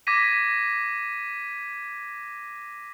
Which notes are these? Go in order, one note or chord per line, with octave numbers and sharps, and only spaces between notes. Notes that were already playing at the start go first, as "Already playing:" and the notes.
D6 G#6 A#6 B6 D#7